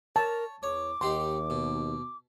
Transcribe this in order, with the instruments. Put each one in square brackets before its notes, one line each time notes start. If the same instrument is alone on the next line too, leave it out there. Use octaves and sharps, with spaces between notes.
[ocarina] A#4 [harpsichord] C#5 [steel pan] A5
[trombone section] E2 [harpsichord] C#5 [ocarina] D6
[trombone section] D#2 [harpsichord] D#4 G4 F#5 [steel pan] C6
[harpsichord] B2